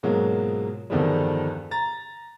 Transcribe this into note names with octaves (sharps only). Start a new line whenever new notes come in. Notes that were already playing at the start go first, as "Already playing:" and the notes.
G#2 B2 F#3 G#3 A#3 F4
E2 G2 D3 D#3 F3 G3
A#5 A6